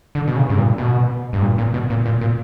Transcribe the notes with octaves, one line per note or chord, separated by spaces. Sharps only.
D3
B2
C#3
G2
A#2
B2
G2
A#2
A#2
B2
A#2
A#2
A#2